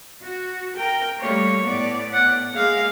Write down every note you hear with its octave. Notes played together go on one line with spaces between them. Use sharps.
F#4
A#4 G5
G3 A3 A#3 C#5
A2 B3 D5
F#5
G#3 A#3 G#4 F5